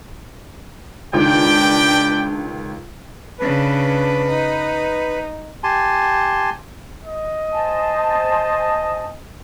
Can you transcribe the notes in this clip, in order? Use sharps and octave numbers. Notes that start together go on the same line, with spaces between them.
C#2 D#3 D4 B4 D5 G5
C#3 D4 B4
D#4
G4 G#5 A5 C6
D#5
C5 G#5 A5